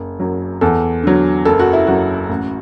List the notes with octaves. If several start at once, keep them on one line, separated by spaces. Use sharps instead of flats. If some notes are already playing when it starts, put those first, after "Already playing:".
Already playing: F#1
F#2 F#3
E2 A4
D3 F#3
F#1 A4
F#4
E4
F#2 F#3 F#4
A1